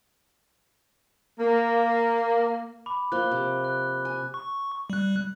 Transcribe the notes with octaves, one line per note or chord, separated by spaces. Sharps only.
A#3
B5 D6
F3 A#3 F#6 G7
C3
F#6
G#5
C#6
G3 F#6